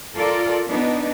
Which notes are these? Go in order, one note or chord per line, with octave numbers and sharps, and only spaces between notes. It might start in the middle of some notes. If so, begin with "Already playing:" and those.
F4 A4 A#4 D5
B3 D4 D#4